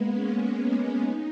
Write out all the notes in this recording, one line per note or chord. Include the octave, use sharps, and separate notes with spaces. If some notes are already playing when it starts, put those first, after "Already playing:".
Already playing: G#3 A#3 B3
C#4
C#4
D#4